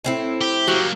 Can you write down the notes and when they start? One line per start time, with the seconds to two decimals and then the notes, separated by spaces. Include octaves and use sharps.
0.04 A2 C4 E4
0.41 G4
0.67 F#3 A#3 F#4 G4